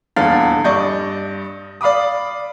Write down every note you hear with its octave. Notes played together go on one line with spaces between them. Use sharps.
D#1 E2 D3 F5 A6
G2 D5 D#5 C#6 G6
D5 F5 B5 D6 D#6